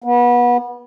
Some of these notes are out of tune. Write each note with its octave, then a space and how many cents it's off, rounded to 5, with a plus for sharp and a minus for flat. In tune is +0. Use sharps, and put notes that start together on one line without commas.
B3 -30